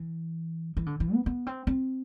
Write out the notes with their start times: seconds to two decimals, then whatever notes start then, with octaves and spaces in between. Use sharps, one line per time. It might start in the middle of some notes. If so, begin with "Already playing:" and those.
Already playing: E3
0.77 E3
0.86 D3
1.00 E3
1.14 B3
1.26 B3
1.47 C4
1.67 C4